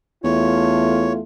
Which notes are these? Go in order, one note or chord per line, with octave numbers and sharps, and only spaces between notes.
E2 A3 F4 C#5